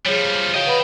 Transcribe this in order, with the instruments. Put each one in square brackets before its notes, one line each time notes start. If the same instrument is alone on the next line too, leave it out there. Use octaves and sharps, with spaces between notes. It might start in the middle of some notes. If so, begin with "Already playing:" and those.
[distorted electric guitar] F3 G3 [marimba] G#4 C#5
[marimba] F#4 C#5 F5 [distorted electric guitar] D#5 G5
[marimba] B4 F#5 B5